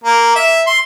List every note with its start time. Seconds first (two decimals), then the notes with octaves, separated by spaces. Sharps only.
0.04 A#3
0.35 E5
0.67 C6